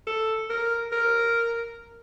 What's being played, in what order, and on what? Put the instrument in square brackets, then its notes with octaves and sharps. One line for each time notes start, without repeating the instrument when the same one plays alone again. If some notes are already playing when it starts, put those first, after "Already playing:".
[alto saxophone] A4
A#4
A#4